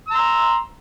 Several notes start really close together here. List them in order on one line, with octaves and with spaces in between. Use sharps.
E6 A#5 C6